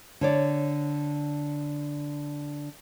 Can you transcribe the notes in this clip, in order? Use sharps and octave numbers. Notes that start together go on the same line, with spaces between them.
D3 C#5 D5